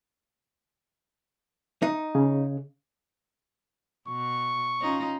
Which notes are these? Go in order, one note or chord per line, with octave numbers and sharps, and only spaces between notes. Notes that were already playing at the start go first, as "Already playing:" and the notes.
D#4
C#3
B2 C#6
C#4 D#4 F4